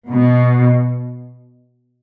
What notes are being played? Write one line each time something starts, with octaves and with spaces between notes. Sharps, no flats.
B2